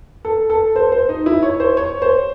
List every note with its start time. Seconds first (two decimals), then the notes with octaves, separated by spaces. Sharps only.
0.25 A4
0.50 A4
0.76 C5
0.92 C5
1.09 D#4
1.26 E4
1.43 C#5
1.60 C5
1.77 C#5
2.02 C5